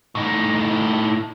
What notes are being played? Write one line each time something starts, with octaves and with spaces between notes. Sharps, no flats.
A2 D#4